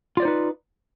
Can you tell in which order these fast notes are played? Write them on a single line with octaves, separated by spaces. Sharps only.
F4 D5 C5 D#4 B4